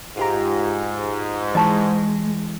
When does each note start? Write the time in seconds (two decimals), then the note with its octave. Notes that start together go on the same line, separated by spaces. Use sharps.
0.17 G#2 F4 G4 A#5
1.55 E3 G#3 D#5 A5 C#6